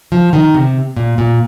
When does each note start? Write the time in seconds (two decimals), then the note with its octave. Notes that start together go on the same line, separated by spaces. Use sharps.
0.12 F3
0.33 D#3
0.54 C3
0.96 A#2
1.18 A#2